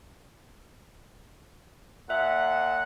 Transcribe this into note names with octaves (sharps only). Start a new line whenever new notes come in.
A#2 E5 F#5